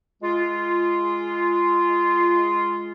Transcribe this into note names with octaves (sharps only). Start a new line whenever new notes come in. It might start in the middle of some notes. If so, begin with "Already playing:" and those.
G#3 F4